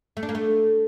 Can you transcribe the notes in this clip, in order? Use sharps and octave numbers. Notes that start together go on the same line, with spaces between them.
A3
D4
A#3
A3